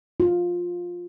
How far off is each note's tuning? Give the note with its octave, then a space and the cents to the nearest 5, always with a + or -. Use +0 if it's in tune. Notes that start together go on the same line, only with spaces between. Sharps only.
F4 +10